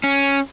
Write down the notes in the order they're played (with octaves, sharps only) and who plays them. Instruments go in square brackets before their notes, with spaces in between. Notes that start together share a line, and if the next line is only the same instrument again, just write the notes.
[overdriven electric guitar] C#4